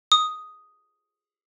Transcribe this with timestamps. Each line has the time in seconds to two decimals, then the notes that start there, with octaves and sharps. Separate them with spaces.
0.12 D#6